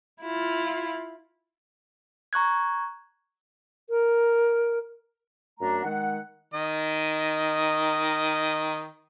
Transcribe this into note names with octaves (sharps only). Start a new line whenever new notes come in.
E4 F4
A#5 C#6 F#6 G#6
A#4
F#2 A3 D4 A#5
D#3 G#3 F#5
D#3 D#5